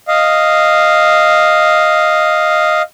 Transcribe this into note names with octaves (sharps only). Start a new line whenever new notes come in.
D#5 F5